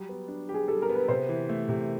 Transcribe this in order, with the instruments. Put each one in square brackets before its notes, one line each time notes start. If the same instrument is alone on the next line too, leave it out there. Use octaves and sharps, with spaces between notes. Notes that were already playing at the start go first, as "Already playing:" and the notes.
Already playing: [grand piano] F#3 G3
B3
D4
G4
[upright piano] G#4
[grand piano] G3 [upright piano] A4
[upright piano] A#4
[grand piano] B3
[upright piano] B4
[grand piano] C3 [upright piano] C5
[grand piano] E3
A3
C3